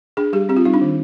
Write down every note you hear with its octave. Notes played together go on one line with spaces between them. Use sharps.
D4 G#4
G3 G4
C4 G4
F4
G3 D#4
D4
D#3